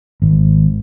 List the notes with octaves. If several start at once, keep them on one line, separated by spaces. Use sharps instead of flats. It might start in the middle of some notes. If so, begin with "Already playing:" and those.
G#1